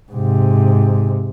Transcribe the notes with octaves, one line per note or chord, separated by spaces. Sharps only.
G#2 C3